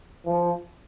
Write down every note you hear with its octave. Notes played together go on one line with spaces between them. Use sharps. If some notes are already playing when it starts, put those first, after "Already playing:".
F3